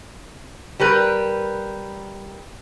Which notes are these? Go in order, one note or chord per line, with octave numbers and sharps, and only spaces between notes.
G3 A#4 B4